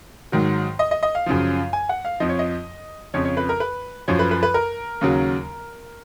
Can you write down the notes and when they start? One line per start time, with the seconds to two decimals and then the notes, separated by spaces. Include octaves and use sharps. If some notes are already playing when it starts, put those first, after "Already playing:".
0.32 G#2 D#3 F#3
0.79 D#5
0.91 D#5
1.03 D#5
1.15 F5
1.26 F#2 C#3 F3
1.73 G#5
1.89 F#5
2.05 F5
2.20 F2 F3 D#5
2.29 C#5
2.39 D#5
3.14 F2 C#3 F3 C#5
3.25 C#5
3.37 B4
3.49 A#4
3.60 B4
4.08 F#2 F3 C#5
4.19 B4
4.31 B4
4.43 B4
4.54 A#4
5.01 D#2 C#3 F#3